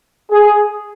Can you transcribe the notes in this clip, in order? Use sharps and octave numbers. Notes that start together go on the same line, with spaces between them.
G#4